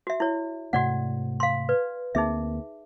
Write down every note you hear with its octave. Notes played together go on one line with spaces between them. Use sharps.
F#4 E5
E4 C#5
G#2 C3 A3 F#4 D5 F#5
F5 C6
B4 D5
D2 A#3 C4 D#4 G#4 E5